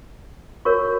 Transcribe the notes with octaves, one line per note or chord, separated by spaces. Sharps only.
F#4 A#4 C#5 C#6